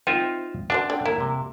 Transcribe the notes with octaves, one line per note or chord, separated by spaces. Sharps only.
C4 D#4 F4 E5
D4 F#4 A4 C5
D3 G4
A#3 E4
C3